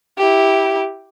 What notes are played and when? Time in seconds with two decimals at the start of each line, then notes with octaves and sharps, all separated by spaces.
0.18 E4 G4